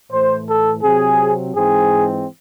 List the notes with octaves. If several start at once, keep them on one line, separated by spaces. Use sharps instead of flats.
A2 E3 A3 C5
A4
C3 F#3 C4 G#4
G#2 E3 G#3 C4 G#4